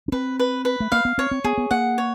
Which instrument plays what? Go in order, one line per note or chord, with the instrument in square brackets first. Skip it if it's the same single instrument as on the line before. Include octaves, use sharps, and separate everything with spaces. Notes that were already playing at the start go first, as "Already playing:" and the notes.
[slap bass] C#4
[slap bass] C4 [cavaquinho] B4
[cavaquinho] B4
B4
[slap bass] A3
[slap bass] A#3 [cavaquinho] F5
[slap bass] B3
[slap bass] C4 [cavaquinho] C#5
[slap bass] C4
[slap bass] B3 [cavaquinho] G#4
[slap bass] B3
[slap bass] A#3 [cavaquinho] F#5
[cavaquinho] C#5